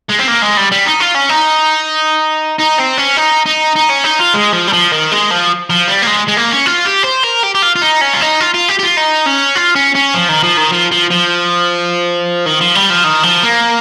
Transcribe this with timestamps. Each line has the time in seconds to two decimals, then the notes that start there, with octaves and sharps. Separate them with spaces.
0.09 G#3
0.19 C4
0.28 A#3
0.42 G#3
0.57 G3
0.72 G3
0.86 D#4
1.00 F4
1.15 C#4
1.29 D#4
2.60 D#4
2.80 C4
2.98 C#4
3.17 D#4
3.46 D#4
3.76 D#4
3.90 C#4
4.04 D#4
4.20 F4
4.34 G#3
4.53 F3
4.67 G3
4.73 F3
4.92 D#3
5.12 G#3
5.31 F3
5.70 F3
5.88 G3
6.02 A#3
6.07 G#3
6.28 G#3
6.37 A#3
6.51 C#4
6.66 F4
6.86 G4
7.04 C5
7.24 A#4
7.44 G4
7.55 G4
7.62 F4
7.76 F4
7.82 D#4
8.01 C#4
8.13 F4
8.21 D#4
8.41 F4
8.54 F4
8.69 G4
8.79 G4
8.83 F4
8.97 D#4
9.26 C#4
9.56 F4
9.76 C#4
9.95 C#4
10.14 F3
10.29 D#3
10.43 F3
10.57 D#3
10.72 F3
10.92 F3
11.10 F3
12.46 D#3
12.61 F3
12.75 G3
12.90 F3
13.04 D#3
13.23 F3
13.43 A#3